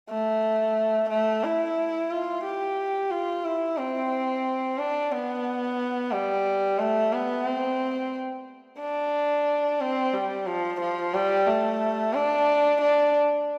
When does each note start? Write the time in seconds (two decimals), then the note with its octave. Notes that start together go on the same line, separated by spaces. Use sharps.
0.09 A3
1.09 A3
1.43 E4
2.10 F4
2.43 G4
3.11 F4
3.44 E4
3.77 C4
4.78 D4
5.12 B3
6.12 G3
6.78 A3
7.13 B3
7.45 C4
8.80 D4
9.80 C4
10.13 G3
10.46 F3
10.80 F3
11.14 G3
11.47 A3
12.14 D4
12.81 D4